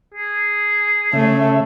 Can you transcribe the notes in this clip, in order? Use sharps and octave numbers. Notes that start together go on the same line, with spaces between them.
G#4
C#3 A3 E5